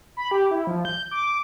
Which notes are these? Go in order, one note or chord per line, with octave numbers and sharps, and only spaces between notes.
B5
G4
E4
F3
G6
D6